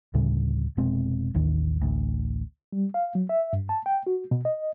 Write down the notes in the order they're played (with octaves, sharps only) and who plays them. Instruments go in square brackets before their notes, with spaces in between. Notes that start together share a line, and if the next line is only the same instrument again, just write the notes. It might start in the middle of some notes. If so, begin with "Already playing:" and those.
[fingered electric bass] D2 A2 C#3 G3
F1 B2 G#3 C4
A1 D#2 D#3
A1 D2
[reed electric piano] G3
F5
F#3
E5
G2
A5
G5
F#4
B2
D#5